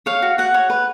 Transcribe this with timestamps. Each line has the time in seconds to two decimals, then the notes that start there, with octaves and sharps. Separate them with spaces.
0.06 C#5 F5
0.22 F#4
0.38 F#4 F#5
0.54 C#5
0.70 B4